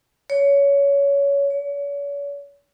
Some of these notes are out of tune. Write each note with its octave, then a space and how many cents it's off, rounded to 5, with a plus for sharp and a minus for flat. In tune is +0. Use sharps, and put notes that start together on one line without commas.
C#5 +20
C#5 +40